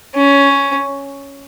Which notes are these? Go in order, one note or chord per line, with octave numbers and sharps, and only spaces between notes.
C#4